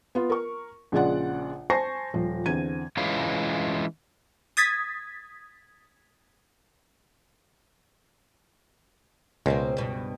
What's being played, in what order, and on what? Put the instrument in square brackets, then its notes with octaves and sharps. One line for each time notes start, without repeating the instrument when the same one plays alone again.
[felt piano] B3 F4
A#4 C#6
A#1 C#3 G#3 F4 D5 F#5
C5 G#5 A5 C#6 A#6 C7
D#1 F3
E2 D3 C4 G#6 D#7
[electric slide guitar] E3 G#3 C#4 E4 F4
[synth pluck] D#6 G#6 A6 B6
[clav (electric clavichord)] C#2 [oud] B2 A#3 C4
[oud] G2 B2